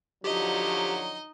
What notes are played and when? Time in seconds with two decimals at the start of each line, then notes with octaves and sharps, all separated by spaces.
0.24 D3 F3 F#3 D#4 G4 D#5